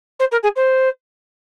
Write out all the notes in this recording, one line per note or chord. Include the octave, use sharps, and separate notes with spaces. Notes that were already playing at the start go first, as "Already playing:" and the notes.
C5
A#4
G#4
C5